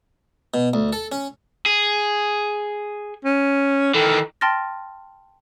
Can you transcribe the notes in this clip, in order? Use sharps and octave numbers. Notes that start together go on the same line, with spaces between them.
B2
D2
A4
C#4
G#4
C#4
D#3 E3 A4
G5 A5 C6 F6 A6 A#6